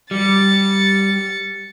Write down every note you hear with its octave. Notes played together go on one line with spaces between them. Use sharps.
G3 A6 C#7